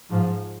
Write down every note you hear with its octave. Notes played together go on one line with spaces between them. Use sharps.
G#2 F3